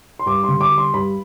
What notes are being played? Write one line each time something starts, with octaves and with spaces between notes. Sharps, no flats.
C6
G2 D6
C6
D3
D6
G3
C6
G2 B5